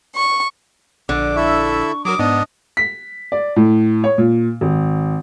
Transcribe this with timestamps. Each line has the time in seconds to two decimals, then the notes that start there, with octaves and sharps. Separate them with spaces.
0.14 C#6
1.09 A#1 D3 D6
1.36 E4 A4 E5 C#6
2.05 F#3 F#4 A#4 D6 D#6
2.19 G#2 B3 D4 D#5
2.77 B6
3.32 D5
3.56 A2
4.04 C#5
4.18 A#2
4.61 G#1